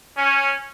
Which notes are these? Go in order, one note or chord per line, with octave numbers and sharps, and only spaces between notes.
C#4